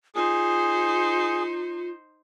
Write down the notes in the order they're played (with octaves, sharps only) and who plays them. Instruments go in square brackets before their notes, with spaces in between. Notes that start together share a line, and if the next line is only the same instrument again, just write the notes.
[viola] D#4 C5 [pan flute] F4 [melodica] G#4